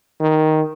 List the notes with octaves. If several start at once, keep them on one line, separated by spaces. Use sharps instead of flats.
D#3